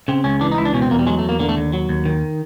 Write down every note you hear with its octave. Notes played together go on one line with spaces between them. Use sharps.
C#3 C4
C#2 C#4
E3 D4
D#4
C#2 E4
D4
B2 C#4
C4
E2 A#3
G3
F#3 G#3
A3
E2 A#3
D3 A#3
A3
D#2
F#3
D#2
D#3